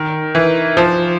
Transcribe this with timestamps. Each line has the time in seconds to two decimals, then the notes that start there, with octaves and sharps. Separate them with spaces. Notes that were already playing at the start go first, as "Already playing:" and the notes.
Already playing: D#3
0.35 E3
0.77 F3